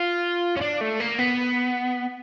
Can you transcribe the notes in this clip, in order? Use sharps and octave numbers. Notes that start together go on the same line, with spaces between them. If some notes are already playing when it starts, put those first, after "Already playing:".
Already playing: F4
C#4
D4
A3
A#3
B3